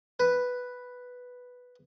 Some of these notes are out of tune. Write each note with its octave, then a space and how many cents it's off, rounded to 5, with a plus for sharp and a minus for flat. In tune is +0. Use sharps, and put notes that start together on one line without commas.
B4 +0